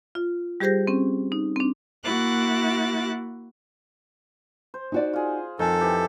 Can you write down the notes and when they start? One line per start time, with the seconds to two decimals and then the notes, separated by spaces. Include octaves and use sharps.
0.15 F4
0.60 G3 G4 G#4 C5 G6 A#6
0.87 C4 C#4
1.32 D#4
1.56 C4 D4
2.04 A#3 E4 F#4 F#6 A6
4.74 C5
4.92 D#4 F#4 D5
5.13 F4 G#4
5.59 F2 D#3 A4 G#5 A5
5.81 E3 G4